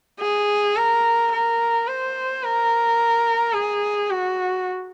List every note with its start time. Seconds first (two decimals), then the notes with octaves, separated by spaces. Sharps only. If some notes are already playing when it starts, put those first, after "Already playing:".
0.20 G#4
0.76 A#4
1.32 A#4
1.87 C5
2.43 A#4
3.53 G#4
4.10 F#4